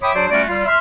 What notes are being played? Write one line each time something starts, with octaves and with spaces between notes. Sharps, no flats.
C#5 E5 G5 B5 D6 D#6
F#3 D4 F#4 G#4 C5 D5
G3 A3 C#4 F4 F#4 D5
G3 F4
E5 C6 F6